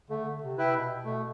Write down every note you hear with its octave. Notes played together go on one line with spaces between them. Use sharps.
D3 A3
C3
E4 B4 E5 G5
B2
B2 A3